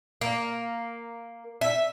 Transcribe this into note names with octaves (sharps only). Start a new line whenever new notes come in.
A#3
E5